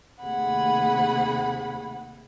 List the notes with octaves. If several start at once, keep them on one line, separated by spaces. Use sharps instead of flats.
D#2 C3 A3 G#4 F#5 B5